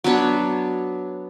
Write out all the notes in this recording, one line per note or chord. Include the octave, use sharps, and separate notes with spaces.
F#3 B3 D4 C#5